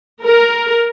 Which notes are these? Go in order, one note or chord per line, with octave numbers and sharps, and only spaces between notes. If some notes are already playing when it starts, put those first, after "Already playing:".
A#4